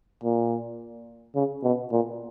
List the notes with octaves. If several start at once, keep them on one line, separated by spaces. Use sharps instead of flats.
A#2
C#3
B2
A#2